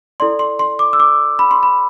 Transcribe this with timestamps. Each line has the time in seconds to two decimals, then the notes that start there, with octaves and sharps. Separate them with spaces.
0.20 E4 A4 D5 C6
0.39 C6
0.59 C6
0.79 D6
0.93 E6
1.00 D6
1.39 B5
1.51 C6
1.63 B5